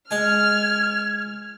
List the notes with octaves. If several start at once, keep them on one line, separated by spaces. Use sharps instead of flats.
G#3 G#5 F6 G#6